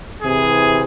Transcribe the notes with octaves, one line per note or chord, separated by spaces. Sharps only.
C3 E3 G#4